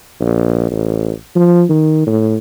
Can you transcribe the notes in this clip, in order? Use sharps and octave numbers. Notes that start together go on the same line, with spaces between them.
A#1
A1
F3
D#3
A2